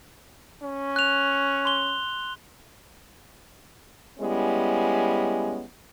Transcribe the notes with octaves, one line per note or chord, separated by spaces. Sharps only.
C#4
F#6 F7
C6 G7
G3 G#3 B3 C#4 E4